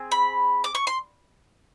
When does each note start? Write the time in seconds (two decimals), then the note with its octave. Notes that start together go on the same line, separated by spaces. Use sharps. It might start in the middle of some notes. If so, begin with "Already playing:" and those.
Already playing: C4 G#4
0.11 B5
0.64 D6
0.75 C#6
0.87 C6